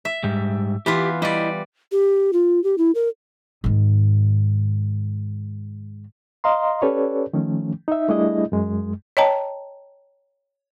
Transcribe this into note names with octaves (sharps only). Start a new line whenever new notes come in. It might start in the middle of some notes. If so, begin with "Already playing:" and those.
E5
G#2 G3
E3 B3 F4 G4
G3 E4 D5 D#5
G4
F4
G4
E4
A#4
G#2 D#3
D#5 F5 A#5 C6
C#4 G4 A4 B4 C#5 D5
D#3 F3 A3 C#4
D#4 E5
G3 A3 D4 E4 G#4 D#5
F#2 G#3
C#5 D#5 G5 A5 A#5